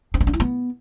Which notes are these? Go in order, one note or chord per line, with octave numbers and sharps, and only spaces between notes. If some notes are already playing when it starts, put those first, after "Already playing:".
C4
B3
D4
E4
B3